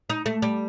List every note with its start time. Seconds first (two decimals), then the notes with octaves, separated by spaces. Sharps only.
0.10 D#4
0.26 A3
0.42 G3